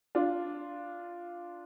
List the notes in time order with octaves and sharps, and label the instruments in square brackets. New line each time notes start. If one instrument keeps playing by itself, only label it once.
[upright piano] D4 F4